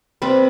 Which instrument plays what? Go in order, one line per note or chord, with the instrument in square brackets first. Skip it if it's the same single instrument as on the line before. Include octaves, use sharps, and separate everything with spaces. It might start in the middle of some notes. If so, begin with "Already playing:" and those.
[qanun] C3 G3 C4 B4